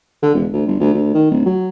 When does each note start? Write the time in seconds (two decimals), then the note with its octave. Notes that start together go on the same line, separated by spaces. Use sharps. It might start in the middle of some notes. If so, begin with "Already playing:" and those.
0.23 D3
0.34 E1
0.53 D2
0.67 G1
0.80 D2
0.94 D2
1.14 D#3
1.31 D1
1.46 F#3